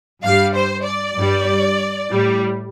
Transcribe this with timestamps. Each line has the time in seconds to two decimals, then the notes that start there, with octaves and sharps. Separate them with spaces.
0.23 G2 G3 F5
0.55 C5
0.86 D5
1.17 G2 G3
2.10 A2 G3